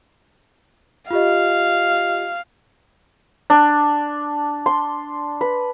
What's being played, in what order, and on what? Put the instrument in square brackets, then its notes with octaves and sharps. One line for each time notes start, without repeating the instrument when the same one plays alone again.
[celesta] F4 G4 D#5 [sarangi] F5
[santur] D4
C6
B4